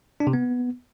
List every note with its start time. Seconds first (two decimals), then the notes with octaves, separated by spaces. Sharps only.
0.20 D4
0.27 C3
0.33 B3